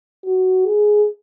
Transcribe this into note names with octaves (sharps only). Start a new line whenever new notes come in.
F#4
G#4